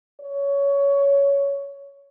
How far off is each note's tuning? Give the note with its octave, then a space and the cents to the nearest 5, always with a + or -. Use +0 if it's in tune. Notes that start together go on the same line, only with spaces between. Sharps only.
C#5 +15